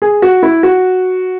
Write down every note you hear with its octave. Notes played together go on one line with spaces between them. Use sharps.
G#4
F#4
E4
F#4